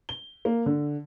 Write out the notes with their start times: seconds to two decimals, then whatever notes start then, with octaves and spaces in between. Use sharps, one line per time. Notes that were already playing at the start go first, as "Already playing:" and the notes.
0.09 G7
0.45 A#3
0.66 D3